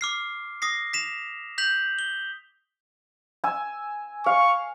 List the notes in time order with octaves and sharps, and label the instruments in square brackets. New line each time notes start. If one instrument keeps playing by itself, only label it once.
[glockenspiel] D6 F6 C7
D#6 A#6 C7
B6 E7 F7
G6 B6 F7 F#7
G7
[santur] G#5 E6
[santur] F5 [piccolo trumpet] C#6